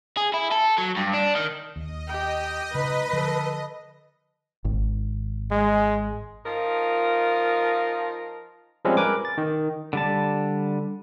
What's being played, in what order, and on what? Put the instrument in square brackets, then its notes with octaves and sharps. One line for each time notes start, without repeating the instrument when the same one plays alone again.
[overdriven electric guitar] G#4
E4
A4
F#3
G2
D4
D#3
[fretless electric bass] D#2 [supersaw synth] D#5
[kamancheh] G4 G5
[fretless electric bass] C#3 [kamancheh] D#4 [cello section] B4
[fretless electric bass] D3 F3 [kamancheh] A4
[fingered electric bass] G#1
[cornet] G#3
[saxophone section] F3 D#4 F4 A#4
[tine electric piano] F3 G3 G#3 C4 C#4
A#4 B4 G#5 D6
A6
D#3
[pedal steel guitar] D3 G3 A5